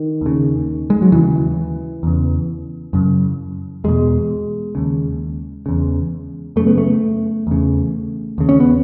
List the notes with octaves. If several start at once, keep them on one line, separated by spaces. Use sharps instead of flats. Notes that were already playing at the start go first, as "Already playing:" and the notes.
Already playing: D#3
D#2 C#3
G#3
F#3
D#2 C#3 E3
E2 C#3
F#2 C#3
E2 B2 G#3
D#2 C#3
E2 C#3
F#2 C#3 A3
B3
A3
E2 C#3
D#2 C#3
C#4
B3